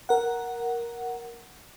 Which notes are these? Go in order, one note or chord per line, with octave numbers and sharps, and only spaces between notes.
A#4 F#5